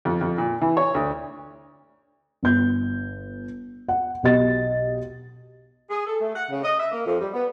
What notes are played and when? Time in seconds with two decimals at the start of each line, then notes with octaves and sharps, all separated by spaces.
0.05 F2
0.21 F2
0.38 A#2
0.61 E3
0.77 C#5
0.95 D2
2.43 G1 G6
3.89 F#5
4.23 B1 G4 D#5 A6
5.90 G#4
6.07 A4
6.21 A3
6.34 F#5
6.51 C#3
6.64 D#5
6.79 E5
6.91 A#3
7.06 F2
7.21 G3
7.33 B3